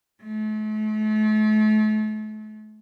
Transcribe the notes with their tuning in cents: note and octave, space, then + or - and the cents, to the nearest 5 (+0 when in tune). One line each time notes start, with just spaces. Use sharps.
A3 -40